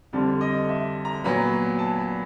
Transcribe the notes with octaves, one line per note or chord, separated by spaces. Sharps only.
F2 D3 G3 C4 A5
D#5
E5
A#5
A#2 F#3 B3 B5
A5
B5